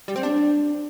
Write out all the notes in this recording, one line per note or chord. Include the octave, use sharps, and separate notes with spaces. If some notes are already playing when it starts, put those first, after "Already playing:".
G3
C4
D4